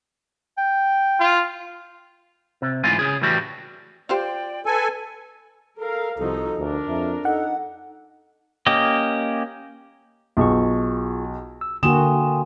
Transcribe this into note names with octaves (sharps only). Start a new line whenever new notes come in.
G5
F4
C3
D2 G#2 E3 F4 G#5
C#3 G#4
A2 E3 G3 F#4
F4 G4 C5 D5 G5
A4 B4 G#5
A4 A#4 F5
C2 F3 D#4 F#4 A4
D2 D4 A#4
F2 E5
D#4 A4 F#5
A#3 C#4 G4 D#5
B1 F4 G#4 C#6
E6
D3 A#3 F#4 G5 G#5 C6 D#6 E7